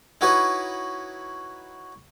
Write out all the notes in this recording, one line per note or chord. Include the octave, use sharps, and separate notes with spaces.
D#4 E4 F#4 B4 C#5 D#5